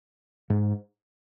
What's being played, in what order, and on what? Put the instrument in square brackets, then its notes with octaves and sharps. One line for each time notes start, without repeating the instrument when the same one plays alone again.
[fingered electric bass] G#2